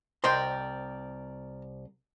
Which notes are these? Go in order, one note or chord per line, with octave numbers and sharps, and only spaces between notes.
C2 A#4 C5 D5 D#5 G5 C6